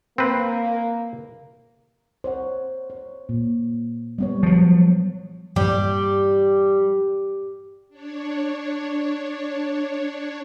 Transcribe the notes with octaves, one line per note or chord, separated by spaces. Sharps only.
A#3 C4 B4
C5 C#5 F#5
C#5
A#2
G3 B3 C#5
F3 F#3
G2 A#2 E3 G3 G4
D4 C#5